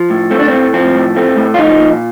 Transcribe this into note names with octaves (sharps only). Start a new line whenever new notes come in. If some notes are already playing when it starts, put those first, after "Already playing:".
Already playing: F3
A2
A3 C4
D4
A2 C4
F3 C4
A2
A3 C4
A2
F4
F3 D#4
A#2